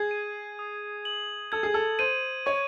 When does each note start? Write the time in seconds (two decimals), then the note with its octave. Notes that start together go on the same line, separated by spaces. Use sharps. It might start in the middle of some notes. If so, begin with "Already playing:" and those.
Already playing: G#4 G#6
0.11 D#7
0.59 D#6
1.05 F#7
1.52 A4 G#6
1.63 G#4
1.74 A4
1.99 C5 D#7
2.46 C#5 C#6